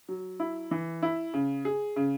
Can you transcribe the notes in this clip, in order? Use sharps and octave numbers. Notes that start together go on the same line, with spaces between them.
F#3
E4
E3
E4
C#3
G#4
C#3